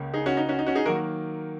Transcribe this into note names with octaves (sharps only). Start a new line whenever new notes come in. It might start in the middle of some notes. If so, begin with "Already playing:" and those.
Already playing: C#2 C#3 A#3
D#4 G#4
C#4 F#4
D#4
C#4 F#4
D#4
C#4 F#4
D#4 G#4
D#3 F#3 A#3 F#4 A#4